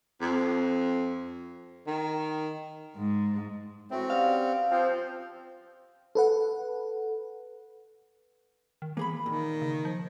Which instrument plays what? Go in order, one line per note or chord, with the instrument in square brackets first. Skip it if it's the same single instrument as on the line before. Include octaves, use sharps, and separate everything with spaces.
[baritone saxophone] F2
D#3
[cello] G#2
[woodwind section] A2 E3 F#4 [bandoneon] C4
[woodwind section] G3 B3 C#4 [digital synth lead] F5
[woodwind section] F3 C5 [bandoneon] C4
[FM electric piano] A4 B4 F#5
[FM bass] D#3
[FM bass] E3 [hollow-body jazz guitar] A#3 G#4 B5
[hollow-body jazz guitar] A#2 [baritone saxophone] D#3
[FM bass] C#3
F3